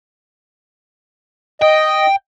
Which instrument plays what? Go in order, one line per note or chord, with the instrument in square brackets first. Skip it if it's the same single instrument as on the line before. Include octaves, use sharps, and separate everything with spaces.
[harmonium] D#5 [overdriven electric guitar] G5